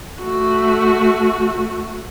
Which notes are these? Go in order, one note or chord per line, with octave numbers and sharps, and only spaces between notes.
A3 F#4